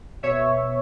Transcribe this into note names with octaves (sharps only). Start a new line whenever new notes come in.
B2 C#5 E5